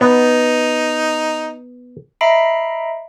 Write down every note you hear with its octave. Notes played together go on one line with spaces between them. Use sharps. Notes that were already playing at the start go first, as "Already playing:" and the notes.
B3 D#4
D#5 E5 A#5 B5 C7 D7